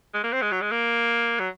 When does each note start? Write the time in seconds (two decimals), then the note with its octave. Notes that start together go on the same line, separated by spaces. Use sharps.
0.14 G#3
0.24 A#3
0.33 C4
0.42 G#3
0.52 F#3
0.61 G#3
0.71 A#3
1.39 F#3